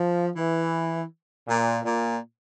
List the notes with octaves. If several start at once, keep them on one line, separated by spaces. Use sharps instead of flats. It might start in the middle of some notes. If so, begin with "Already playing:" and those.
Already playing: F3
E3
A#2
A#2